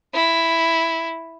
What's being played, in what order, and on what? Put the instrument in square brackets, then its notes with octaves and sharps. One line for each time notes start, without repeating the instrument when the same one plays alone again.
[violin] E4